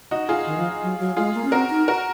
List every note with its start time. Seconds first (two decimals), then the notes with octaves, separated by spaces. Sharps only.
0.11 D#4 F#4
0.29 F4 G#4
0.46 D#3
0.58 F3
0.82 F#3
0.99 F#3
1.17 G#3 F4 G#4
1.35 A#3
1.45 C#4
1.52 C4 F#4 A#4
1.70 D#4
1.88 F#4 A#4